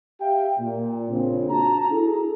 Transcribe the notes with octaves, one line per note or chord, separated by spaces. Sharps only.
G4 E5 F5 G5
A#2
A#1 C#3 C4
D4 F#4 A5 A#5
E4 G#4 A4